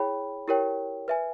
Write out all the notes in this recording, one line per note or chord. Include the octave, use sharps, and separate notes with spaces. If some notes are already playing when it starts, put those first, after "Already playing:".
Already playing: E4 G#4 C#5 G5 B5
E4 G4 A#4 C#5 G5
B4 E5 G#5